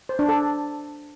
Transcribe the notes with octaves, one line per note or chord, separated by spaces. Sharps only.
C5
D4
A4